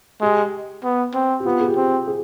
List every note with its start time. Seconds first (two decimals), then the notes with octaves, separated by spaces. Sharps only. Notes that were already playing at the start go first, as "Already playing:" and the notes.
0.21 G#3 G4
0.84 B3
1.14 C4
1.40 G4
1.45 B3 F4
1.60 G#4
1.66 G4
1.76 C4
2.07 G#4